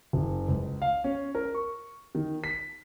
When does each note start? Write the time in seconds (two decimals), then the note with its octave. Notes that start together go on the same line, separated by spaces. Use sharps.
0.13 F#1
0.48 C#2
0.82 F5
1.04 C#4
1.35 A#4
1.55 C#6
2.15 D#3
2.44 B6